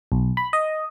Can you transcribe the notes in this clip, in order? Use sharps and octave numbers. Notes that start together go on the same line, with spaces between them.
B1
B5
D#5